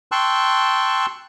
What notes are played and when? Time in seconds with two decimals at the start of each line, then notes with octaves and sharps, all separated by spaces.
0.12 G5 A5 C6 C#6 E6 F#6